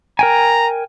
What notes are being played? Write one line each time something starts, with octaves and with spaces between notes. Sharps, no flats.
A#4 G5 G#5 A#5